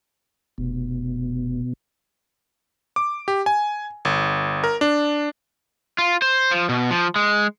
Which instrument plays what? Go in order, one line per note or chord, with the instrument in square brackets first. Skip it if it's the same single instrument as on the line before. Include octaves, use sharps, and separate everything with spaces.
[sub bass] F1 [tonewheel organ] B2
[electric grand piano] D6
G4
G#5
G1
A#4
D4
[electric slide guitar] F4
C5
F3
B2
F3
G#3